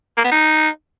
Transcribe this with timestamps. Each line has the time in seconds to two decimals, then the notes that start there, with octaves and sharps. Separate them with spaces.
0.17 A#3
0.25 B3
0.32 D#4